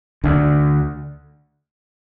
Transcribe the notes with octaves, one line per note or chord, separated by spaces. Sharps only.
D2 D3